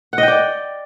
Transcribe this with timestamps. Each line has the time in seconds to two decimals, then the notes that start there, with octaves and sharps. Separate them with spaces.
0.13 F#5
0.18 D#5
0.23 G5
0.28 D5